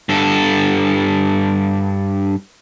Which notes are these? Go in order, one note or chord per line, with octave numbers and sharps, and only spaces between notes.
G2 A4